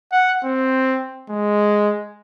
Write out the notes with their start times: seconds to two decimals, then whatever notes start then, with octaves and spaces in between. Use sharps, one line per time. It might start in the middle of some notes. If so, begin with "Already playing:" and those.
0.12 F#5
0.44 C4
1.29 G#3